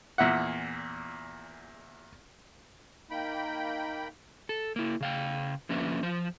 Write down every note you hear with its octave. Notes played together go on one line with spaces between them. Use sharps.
E2 A#2 E5 F#5
A#3 D#4 G5 B5
A4
A#3 E4
C#3 F5 G5
D3 F3 A#3 C#4 B4 E5
F3 C5